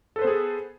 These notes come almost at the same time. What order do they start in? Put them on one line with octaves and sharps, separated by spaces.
A4 B4 C5 B3 G#4